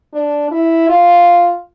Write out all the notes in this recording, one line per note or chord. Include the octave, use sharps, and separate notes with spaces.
D4
E4
F4